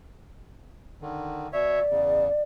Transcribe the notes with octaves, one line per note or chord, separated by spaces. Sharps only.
D3 D#3
B2 C#5 D5 E5
E2 C#3